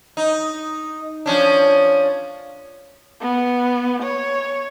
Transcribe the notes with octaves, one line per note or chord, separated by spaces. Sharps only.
D#4
F3 C#4 D4
B3
C#5